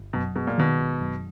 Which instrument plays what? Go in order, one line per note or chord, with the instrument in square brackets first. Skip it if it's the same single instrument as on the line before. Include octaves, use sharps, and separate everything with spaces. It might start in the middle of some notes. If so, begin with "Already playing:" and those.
Already playing: [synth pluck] G1
[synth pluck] F#2 [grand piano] B2
[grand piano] B2 [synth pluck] G#3
[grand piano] A#2
[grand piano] B2 [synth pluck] D#3
[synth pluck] G1
F#2